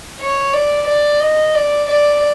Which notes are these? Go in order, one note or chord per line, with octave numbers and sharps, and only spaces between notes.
C#5
D5
D5
D#5
D5
D5